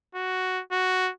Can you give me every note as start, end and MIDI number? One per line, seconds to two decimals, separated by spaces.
0.15 0.62 66
0.72 1.11 66